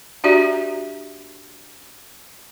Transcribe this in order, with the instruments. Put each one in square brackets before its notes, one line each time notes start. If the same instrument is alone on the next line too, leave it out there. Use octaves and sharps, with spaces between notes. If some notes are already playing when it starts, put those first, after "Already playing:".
[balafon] D4 F#4 G4 D5 E5 A#5